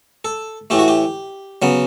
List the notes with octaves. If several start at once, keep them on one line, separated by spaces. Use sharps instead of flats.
A4
A2 E3 A3 G4
F#4
G4
C#3 F#3 B3